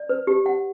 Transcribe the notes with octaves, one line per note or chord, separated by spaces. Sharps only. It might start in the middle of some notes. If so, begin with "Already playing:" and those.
Already playing: D5
B4
G4
F#5